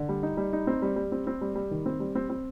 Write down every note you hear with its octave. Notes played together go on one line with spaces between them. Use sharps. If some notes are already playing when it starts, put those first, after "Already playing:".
Already playing: D3
G3
D#4
G3
D#4
C4
G3
G3
C4
C4
G3
G3
D#3
C4
G3
C4
C4